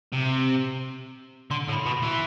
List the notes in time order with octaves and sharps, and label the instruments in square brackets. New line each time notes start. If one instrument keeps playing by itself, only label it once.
[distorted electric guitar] C3
[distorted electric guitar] D3 [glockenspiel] C6
[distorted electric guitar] A2
[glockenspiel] B5
[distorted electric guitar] B2
E3